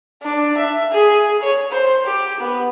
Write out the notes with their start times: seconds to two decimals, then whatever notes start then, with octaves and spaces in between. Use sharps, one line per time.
0.22 D4
0.57 E5
0.91 G#4
1.43 C#5
1.71 C5
2.06 G4
2.40 B3